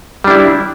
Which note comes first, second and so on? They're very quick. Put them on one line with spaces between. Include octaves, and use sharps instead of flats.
G3 D4 E4